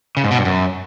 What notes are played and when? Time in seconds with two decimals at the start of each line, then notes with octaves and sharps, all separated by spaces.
0.17 C#3
0.24 G#2
0.31 B2
0.38 G2
0.45 F#2